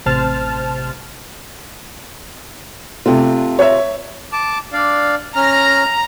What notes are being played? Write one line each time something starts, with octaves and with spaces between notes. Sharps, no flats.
A1 C3 C5 A5 F6
C3 A3 D4 F4
C#5 E5
A5 D6
D4 D5 F5
C#4 A#5 F6